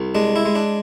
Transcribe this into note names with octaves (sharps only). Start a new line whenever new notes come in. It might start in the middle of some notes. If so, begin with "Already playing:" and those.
Already playing: C2
G#3 D4
E4
G#3
D4